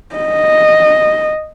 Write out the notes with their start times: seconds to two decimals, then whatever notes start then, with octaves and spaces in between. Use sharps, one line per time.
0.16 D#5